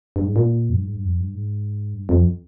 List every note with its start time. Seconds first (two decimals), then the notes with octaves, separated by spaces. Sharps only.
0.16 G2
0.26 G#2
0.36 A#2
0.70 F2
0.75 G2
0.85 G#2
0.95 G2
1.05 F2
1.20 G2
1.35 G#2
1.94 G2
2.09 F2